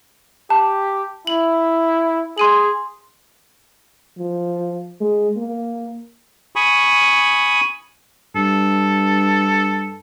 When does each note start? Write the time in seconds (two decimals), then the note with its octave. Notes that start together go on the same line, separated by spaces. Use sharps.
0.50 G4 A5
1.27 E4 F#7
2.38 G#4 C6 D#7 F#7
4.19 F3
5.01 G#3
5.37 A#3
6.56 G#5 B5 C#6 D#6
8.36 G2 A4